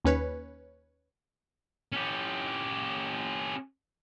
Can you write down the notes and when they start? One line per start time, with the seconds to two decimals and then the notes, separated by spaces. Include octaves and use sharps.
0.05 D#2 C#4 B4 C#5
1.92 C#4 G4